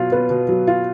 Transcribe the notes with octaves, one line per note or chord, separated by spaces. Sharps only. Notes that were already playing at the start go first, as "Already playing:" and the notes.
Already playing: B2 F#3 F4
B3
B2
F#3
F4